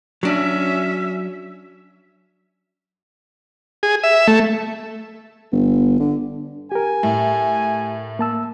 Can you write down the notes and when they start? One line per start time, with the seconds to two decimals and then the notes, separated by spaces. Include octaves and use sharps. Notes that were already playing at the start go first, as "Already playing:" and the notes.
0.23 F#3 C#4 D4 E5
3.83 G#4
4.04 E5
4.27 A3
5.52 G1
6.00 D3
6.72 G4 A#4 G#5
7.03 A2
8.19 A#3 A5 E6